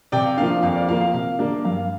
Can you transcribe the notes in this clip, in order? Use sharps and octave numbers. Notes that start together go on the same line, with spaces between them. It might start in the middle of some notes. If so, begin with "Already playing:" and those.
C3 D5 G5
F5
F3 A#3 D4 F5
F2 F5
D5
F3 A#3 F5
F5
C3 F5
G3 A#3 D4
G2 F5